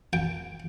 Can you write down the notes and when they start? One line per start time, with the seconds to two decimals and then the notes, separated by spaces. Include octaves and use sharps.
0.13 G5